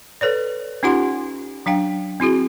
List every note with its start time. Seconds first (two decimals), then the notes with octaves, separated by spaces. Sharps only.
0.21 A4 B4 C#5 D5
0.83 C#4 D#4 F4 G4 F#5 C6
1.66 F#3 D4 F5 G5
2.20 C4 E4 F#4 G#4